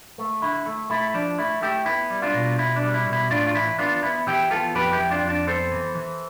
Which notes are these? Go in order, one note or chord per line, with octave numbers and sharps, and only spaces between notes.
A3
D3 E4
A3
A3 E4
F3 D4
A3 E4
A3 E4 G4
B3 E4
G3
D4 F4
B2
B2 E4
D4
G3
E4
B2
E4
A2 D4 F4
F4
E3 E4
B3 D4 F4
B3 E4
E3 E4 G4
B3 F4 A4
F2 G4 B4
E4 G4
F2
D4 F4
F2
D4
B3 A4 C5
E3
E3